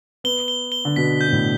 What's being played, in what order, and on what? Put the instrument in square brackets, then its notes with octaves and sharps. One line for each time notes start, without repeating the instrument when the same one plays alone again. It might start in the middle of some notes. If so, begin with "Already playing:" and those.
[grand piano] B3 [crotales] G7
[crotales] G7
G7
[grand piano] D3
[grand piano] B2 [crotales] B6
[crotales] G6
[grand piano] B2
A2